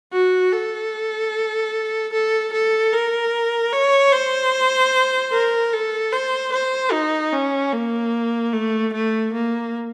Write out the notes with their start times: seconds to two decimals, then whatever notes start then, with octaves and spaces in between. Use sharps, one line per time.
0.12 F#4
0.52 A4
2.13 A4
2.53 A4
2.93 A#4
3.72 C#5
4.13 C5
5.33 A#4
5.73 A4
6.13 C5
6.53 C5
6.92 D#4
7.32 C#4
7.73 A#3
8.53 A3
8.93 A3
9.33 A#3